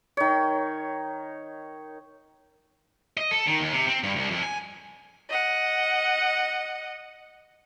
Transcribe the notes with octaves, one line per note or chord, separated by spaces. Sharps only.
D#3 C#5
D#5
A4
D#3
D#2
C3
C4
G2
C2
F2
G#5
D#5 F#5